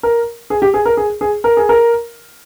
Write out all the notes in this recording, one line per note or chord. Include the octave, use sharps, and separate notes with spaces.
A#4
G#4
G4
G#4
A#4
G#4
G#4
A#4
G#4
A#4